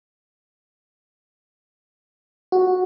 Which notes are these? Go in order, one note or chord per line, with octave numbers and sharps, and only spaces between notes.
F#4